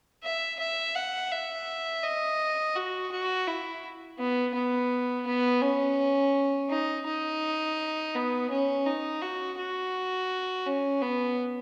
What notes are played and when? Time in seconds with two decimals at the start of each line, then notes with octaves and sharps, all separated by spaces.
0.24 E5
0.59 E5
0.95 F#5
1.32 E5
2.03 D#5
2.76 F#4
3.12 F#4
3.47 E4
4.19 B3
4.54 B3
5.27 B3
5.62 C#4
6.70 D#4
7.06 D#4
8.15 B3
8.51 C#4
8.87 D#4
9.22 F#4
9.58 F#4
10.66 C#4
11.02 B3